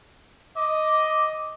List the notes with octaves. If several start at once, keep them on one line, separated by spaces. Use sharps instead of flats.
D#5 D6